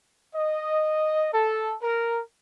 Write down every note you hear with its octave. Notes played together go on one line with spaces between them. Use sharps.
D#5
A4
A#4